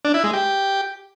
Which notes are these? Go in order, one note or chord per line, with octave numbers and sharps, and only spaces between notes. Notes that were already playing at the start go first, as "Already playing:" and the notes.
D4
E4
G#3
G4